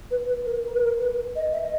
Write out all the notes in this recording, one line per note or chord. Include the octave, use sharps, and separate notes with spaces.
B4
B4
A#4
A#4
B4
A#4
B4
D#5
E5
D#5